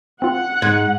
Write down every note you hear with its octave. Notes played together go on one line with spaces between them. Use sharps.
C4 F4 F#5
G#2 G#6